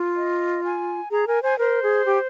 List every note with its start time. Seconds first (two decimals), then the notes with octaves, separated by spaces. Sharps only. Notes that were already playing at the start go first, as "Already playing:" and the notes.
Already playing: F4
0.16 D#5
0.64 G#5
1.11 G#4 A#5
1.27 A#4 G#5
1.43 C5 G#5
1.58 A#4 C5
1.83 G#4
2.06 G4